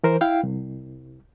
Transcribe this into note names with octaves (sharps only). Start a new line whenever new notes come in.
E3 A#4 C5
E4 F5 G5
C2